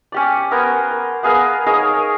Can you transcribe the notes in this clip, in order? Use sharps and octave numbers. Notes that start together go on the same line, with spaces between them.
C#4 G4 D5
B3 A#4 C5 G#5
A#4
B3 G#4 A#4 F5
D#4 G#4 A#4 C#5